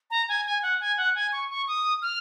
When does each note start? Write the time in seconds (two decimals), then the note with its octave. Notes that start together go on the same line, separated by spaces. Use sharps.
0.11 A#5
0.29 G#5
0.46 G#5
0.63 F#5
0.80 G#5
0.97 F#5
1.15 G#5
1.32 C#6
1.50 C#6
1.68 D#6
2.02 F6